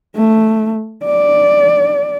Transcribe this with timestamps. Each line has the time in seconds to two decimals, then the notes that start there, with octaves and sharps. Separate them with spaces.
0.16 A3
1.05 D5